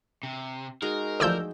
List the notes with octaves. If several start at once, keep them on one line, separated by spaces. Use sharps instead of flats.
C3
G#3 D#4 F#4 A#4
D2 E3 F3 D5 E6 G6